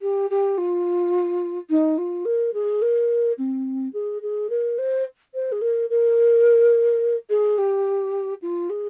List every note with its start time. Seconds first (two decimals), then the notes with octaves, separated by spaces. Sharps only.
0.02 G4
0.30 G4
0.58 F4
1.70 D#4
1.98 F4
2.25 A#4
2.54 G#4
2.82 A#4
3.38 C4
3.93 G#4
4.22 G#4
4.50 A#4
4.78 C5
5.34 C5
5.52 G#4
5.62 A#4
5.90 A#4
7.30 G#4
7.58 G4
8.42 F4
8.70 G#4